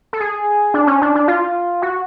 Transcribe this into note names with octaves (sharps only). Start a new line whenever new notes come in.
A4
G#4
D4
C#4
D4
D4
F4
F#4